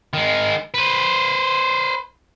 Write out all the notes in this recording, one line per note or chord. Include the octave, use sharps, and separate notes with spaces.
D#3 G#3
B4 C5